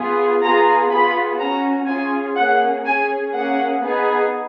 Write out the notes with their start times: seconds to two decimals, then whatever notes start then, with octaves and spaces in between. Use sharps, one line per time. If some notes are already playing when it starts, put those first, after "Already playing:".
Already playing: B3 F4 G#4
0.42 B3 F4 G#4 A#5
0.91 B3 F4 G#4 B5
1.39 C#4 F#4 A#5
1.88 C#4 F4 G#4 G#5
2.36 A#3 C#4 G#4 F#5
2.85 C#4 G#4 G#5
3.33 A#3 C#4 G#4 F#5
3.82 B3 D#4 G#4